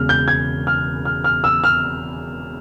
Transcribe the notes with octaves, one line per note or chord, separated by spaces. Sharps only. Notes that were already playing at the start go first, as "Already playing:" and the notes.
Already playing: E1 E2 C#3 F6
G6
G#6
F6
F6
F6
E6
F6